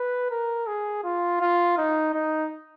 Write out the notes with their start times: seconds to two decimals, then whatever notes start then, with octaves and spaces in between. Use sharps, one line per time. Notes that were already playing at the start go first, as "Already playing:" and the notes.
Already playing: B4
0.30 A#4
0.67 G#4
1.04 F4
1.41 F4
1.77 D#4
2.14 D#4